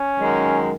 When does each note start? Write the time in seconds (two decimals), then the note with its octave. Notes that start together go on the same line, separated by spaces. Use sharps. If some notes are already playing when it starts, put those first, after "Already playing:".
Already playing: C#4
0.20 F#2 D#3 G#3